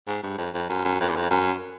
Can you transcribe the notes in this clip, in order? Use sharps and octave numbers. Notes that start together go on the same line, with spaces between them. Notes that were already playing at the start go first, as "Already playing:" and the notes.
G#2
G2
F2
F2
F#2
F#2
F2
E2
F2
F#2